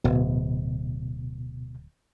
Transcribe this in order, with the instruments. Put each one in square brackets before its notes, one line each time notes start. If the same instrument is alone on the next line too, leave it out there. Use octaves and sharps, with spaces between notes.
[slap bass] D1 [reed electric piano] B2